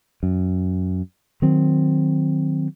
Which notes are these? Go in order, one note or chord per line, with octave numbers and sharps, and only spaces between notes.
F#2
D#3 F#3 C4